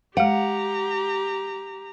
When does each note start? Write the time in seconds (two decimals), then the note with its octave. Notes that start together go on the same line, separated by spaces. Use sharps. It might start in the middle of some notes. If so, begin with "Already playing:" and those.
0.17 G#3 G4 F5 F#5 A#5